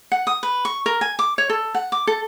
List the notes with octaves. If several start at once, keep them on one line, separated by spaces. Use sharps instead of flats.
F#5
D#6
B4
C#6
A#4
G#5
D6
C#5
A4
F#5
D6
A4